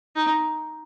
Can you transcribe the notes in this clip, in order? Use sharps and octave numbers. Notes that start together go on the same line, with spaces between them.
D#4